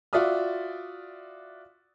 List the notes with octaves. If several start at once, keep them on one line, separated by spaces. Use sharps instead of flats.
F4 F#4 D5 E5 D#6 F6